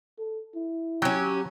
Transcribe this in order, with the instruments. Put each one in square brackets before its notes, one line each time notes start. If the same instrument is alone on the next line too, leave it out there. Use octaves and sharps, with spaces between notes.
[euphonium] A4
E4
[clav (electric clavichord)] F#3 [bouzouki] C#4 G4